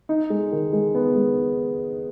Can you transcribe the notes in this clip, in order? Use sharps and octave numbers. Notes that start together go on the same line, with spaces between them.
D#4
G#3
D#3
G#3
B3
G#3